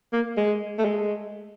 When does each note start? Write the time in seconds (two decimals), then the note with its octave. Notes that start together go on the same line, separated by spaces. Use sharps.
0.13 A#3
0.37 G#3
0.78 A3
0.85 G#3